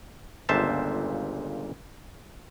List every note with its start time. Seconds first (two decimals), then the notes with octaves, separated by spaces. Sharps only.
0.49 G1 C#2 A#2 C5 E5 A5